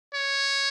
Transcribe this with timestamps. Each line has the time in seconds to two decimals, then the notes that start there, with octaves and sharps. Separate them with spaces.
0.15 C#5